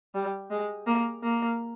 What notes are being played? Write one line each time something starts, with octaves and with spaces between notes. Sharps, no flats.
G3
G#3
A#3
A#3